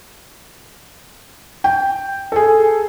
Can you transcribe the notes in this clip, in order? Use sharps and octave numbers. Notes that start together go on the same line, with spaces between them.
G5
G#4 A4